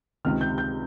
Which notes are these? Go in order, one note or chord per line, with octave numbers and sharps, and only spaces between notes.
C#2 C3 D#3 F6
G6
G6